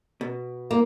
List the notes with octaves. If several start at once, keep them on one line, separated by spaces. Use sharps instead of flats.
B2
C2 A#3